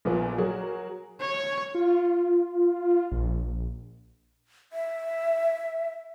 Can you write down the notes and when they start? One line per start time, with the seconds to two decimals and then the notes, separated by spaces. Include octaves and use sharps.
0.05 A#1 A#2 B3
0.38 F#3 F#4 G#4 A#4
1.20 C#5
1.75 F4
3.12 A#1
4.73 E5